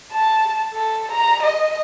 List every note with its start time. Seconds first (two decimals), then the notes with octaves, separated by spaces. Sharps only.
0.13 A5
0.74 A4
1.11 A#5
1.43 D#5